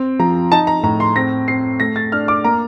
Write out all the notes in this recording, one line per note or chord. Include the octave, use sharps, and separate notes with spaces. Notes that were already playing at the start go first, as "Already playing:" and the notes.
Already playing: C4
F3 A#5
D#4 A5
A#5
A2 A#5
C6
C4 A#6
C4 C7
A3 A#6
A6
D4 F6
D6
A#3 A#5